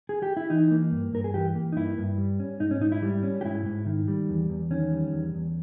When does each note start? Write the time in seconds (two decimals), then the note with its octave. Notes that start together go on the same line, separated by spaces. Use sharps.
0.09 G#4
0.23 G4
0.37 E4
0.50 E3 D#4
0.71 A#3
0.91 G2
1.13 G2 A#4
1.24 G#4
1.34 E3 G4
1.55 A#3
1.72 D#4
1.76 G2 E4
1.98 G2
2.18 G3
2.40 C#4
2.60 G#2 D#4
2.71 C#4
2.81 G#2 D#4
2.92 E4
3.02 G3
3.23 C#4
3.41 G4
3.45 G#2 E4
3.66 G#2
3.86 D#3
4.08 G3
4.29 E2
4.50 E2
4.71 D#3 C#4
4.92 G3
5.13 E2
5.35 E2